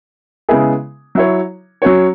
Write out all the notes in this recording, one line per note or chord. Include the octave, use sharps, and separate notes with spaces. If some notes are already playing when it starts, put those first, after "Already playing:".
C#3 G#3 B3 E4 G#4
F#3 E4 C#5
F#3 C#4 F#4 C#5